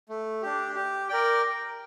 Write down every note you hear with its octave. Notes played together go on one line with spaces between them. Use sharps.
A3
D4 G4
G4
A#4 D5 G5